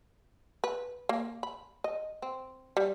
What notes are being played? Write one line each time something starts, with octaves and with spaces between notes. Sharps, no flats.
B4
A#3
B5
D#5
C4
G3